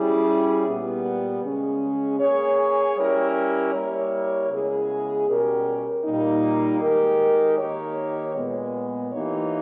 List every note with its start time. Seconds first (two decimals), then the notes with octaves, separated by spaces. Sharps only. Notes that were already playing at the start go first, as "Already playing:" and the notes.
Already playing: G3 C#4 E4 G#4
0.66 A#2 G3 B3
1.43 C#3 G#3 C#4 G#4
2.20 A#3 C#4 G#4 C#5
2.97 G3 C#4 E4 G4 A#4
3.74 G3 A#3 E4 A#4 C#5
4.50 C#3 G#3 B3 E4 G#4
5.27 B2 G3 C#4 G4 A#4
6.04 A#2 G3 A#3 D#4
6.81 D#3 G#3 D#4 G4 A#4
7.58 D#3 A#3 D#4 G4 C#5
8.35 A#2 G#3 B3
9.12 E3 A#3 D#4 G4 C#5